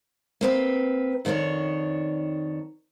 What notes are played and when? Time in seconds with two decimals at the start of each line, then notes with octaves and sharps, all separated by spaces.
0.41 A#3 C4 B4
1.25 F2 D#3 D4 A4 C#5